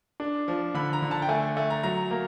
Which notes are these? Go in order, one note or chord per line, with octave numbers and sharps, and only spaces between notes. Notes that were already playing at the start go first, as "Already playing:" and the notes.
D4
F3
D3 B5
A#5
D3
A5
G5
A3 G#5
A3
A#5
F#3 A#5
A#3